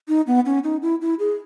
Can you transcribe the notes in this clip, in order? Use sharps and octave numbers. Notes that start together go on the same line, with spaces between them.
D#4
B3
C#4
D#4
E4
E4
G#4